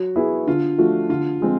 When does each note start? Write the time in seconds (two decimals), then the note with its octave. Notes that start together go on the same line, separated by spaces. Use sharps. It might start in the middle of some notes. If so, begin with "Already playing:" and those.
Already playing: F#3 F#4
0.16 B3 E4 G#4
0.47 D3 F4
0.78 F3 A3 D4 F#4
1.09 D3 F4
1.41 F3 G#3 C4